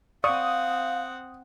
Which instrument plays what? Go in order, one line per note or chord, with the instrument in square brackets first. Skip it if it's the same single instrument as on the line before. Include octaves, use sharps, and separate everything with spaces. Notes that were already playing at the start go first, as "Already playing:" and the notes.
[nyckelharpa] C4 F#5 [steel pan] D5 C#6 [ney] F5 [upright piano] D#6